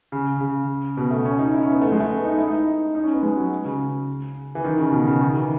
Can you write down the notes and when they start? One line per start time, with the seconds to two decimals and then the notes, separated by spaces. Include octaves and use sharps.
0.12 C#3
0.41 C#3
0.97 B2
1.11 A3
1.25 C#4
1.39 D#4
1.54 E4
1.63 C#4
1.72 B3
1.81 A3
1.92 G#3
2.00 A3
2.10 B3
2.24 D#4
2.38 E4
2.47 D#4
2.95 D#4
3.04 C#4
3.13 B3
3.23 G#3
3.37 F#3
3.65 C#3
4.55 E3
4.64 D#3
4.79 C#3
4.92 B2
5.07 C#3
5.21 D#3
5.35 E3